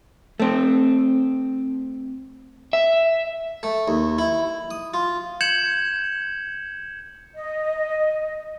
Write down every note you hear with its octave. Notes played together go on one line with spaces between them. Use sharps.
A3 C4
E5
A3
D#2
E4
D#6
F4
G6 G#6 C#7 E7 F#7
D#5